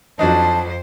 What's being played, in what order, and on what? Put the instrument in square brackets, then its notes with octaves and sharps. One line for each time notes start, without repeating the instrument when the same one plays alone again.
[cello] F2 C5 [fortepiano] F#3 D4 D#4 [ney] A5